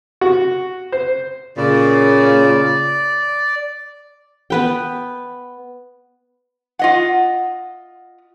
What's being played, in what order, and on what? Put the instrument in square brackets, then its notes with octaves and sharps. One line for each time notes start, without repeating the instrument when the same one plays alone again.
[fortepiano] F#4
C5
[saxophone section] A#2 C#3 [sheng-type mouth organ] D5
[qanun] B3 B4 G5
[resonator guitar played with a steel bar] F4 D#5 F#5